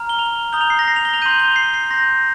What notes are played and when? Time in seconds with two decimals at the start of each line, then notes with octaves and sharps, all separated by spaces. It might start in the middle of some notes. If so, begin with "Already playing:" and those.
Already playing: A#5 F6
0.09 G7
0.19 F7
0.53 A#5 D#6 G6 G7
0.61 F7
0.70 C7
0.79 A#6
0.88 C7
0.96 F7
1.05 G7
1.14 F7
1.22 G6 D#7
1.26 C6
1.31 F7
1.40 G7
1.56 C7
1.74 C7
1.91 C6 G6 A#6